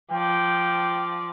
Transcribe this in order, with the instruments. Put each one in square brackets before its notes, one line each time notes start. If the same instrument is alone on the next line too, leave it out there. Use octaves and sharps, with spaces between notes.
[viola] F3 D5 [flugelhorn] G5